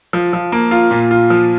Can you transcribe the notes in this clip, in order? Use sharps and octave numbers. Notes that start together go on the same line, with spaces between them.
F3
F3
A#3
F4
A#2
F4
F3